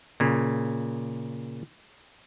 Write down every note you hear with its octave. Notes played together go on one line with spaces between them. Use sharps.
A#2 C#3